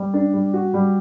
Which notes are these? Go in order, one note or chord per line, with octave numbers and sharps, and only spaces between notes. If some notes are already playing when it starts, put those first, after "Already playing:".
Already playing: G3
D4
G3
F#4
G3